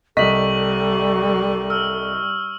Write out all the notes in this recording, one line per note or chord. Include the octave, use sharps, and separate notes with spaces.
C2 G3 A4 D#5 C#6 B6 F#7
E6 F6